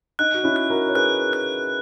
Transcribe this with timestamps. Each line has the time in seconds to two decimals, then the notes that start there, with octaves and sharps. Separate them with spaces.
0.19 D#4 F#6
0.34 F#4
0.43 C#4 E4
0.56 F#6
0.70 F#4 A#4
0.88 C#5
0.95 G#4 B4 F#6
1.33 F#6